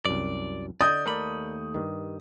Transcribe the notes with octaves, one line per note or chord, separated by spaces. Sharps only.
C2 F#2 D5
D3 D5 D#5 D#6 G6
D#2 A3 A#4 D5 B5
G2 D#3